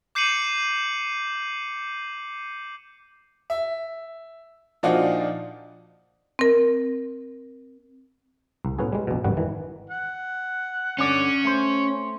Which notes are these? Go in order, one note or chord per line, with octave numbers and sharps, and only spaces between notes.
D6 G6 C7 C#7 D#7 F#7
E5
A#2 F3 D4 D#4 F4 F#4
C4 A#4
C2
A2 B3 C#4 F#4 G#4
G3 G#3
A#1 B2
G#1 F#2 G3 F#5
D#3 E3
F#5
G2 D3 C#4 D5
A3 C5